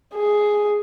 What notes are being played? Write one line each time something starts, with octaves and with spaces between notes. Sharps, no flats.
G#4